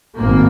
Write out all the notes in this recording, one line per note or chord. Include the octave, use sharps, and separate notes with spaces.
G#1 A#3